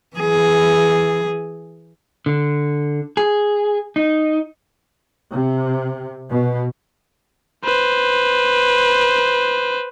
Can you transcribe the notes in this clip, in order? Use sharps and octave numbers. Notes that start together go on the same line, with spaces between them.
E3 G#4
D3
G#4
D#4
C3
B2
B4 C5